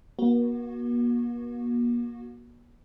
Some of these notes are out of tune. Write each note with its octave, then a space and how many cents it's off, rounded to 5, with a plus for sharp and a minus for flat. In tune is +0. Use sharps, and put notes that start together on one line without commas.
A#3 +45 F#4 +0